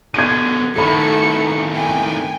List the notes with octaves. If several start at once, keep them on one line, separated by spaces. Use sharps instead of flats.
B2 D3 G#6 D#7
A2 D#3 A3 F#4 A4 B5 C#7
G5 G#5